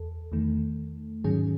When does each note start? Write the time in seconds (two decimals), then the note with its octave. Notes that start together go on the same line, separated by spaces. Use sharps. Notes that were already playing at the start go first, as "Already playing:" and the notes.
Already playing: E2 A4
0.32 E2 D#3 A3
1.24 G#2 D#3 F#3 C#4 G#4